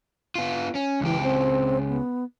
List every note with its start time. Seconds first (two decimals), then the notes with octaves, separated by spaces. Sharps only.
0.35 B3 F4
0.75 C#4
1.01 C#2 E3 G4
1.22 C4
1.88 B3